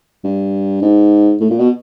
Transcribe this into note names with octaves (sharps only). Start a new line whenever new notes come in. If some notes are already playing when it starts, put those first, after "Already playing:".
G2
G#2
A2
A#2
B2